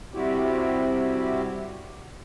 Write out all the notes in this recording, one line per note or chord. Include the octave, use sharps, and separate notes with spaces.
C3 G3 C4 E4 F#4 G4